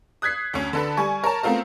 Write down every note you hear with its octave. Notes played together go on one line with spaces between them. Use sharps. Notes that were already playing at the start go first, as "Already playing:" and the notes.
D#6 F#6 G#6 B6 C7
D2 C#4
D3 A4 B4
G3 G#5 C#6
A#4 C#5 A5
A3 B3 C4 F4 A#4